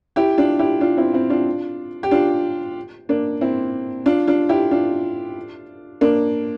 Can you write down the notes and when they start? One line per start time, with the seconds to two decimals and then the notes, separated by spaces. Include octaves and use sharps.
0.16 E4 G4
0.38 D4 F4
0.59 E4 G4
0.81 D4 F4
0.97 C4 E4
1.13 C4 E4
1.30 D4 F4
2.03 G4
2.11 D4 F4
3.09 A#3 D4
3.41 C4 E4
4.06 D4 F4
4.27 D4 F4
4.49 E4 G4
4.71 D4 F4
6.01 A#3 D4